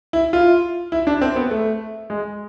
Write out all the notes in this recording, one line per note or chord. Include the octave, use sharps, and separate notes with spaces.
E4
F4
E4
D4
C4
B3
A3
G#3